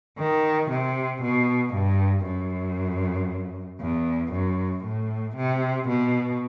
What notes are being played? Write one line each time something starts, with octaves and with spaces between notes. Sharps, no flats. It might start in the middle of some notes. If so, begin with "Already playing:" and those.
D#3
C3
B2
G2
F#2
E2
F#2
A2
C3
B2